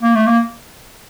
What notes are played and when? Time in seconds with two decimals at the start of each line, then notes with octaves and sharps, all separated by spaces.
0.03 A#3
0.15 A3
0.26 A#3